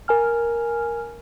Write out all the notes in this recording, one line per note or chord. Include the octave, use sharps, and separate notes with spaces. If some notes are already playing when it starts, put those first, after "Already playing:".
A#4 G#5 F6